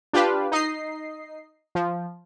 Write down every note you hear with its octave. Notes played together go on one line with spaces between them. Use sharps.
D4 F4 G4 B4 F5
D#4 D#5 C7
F3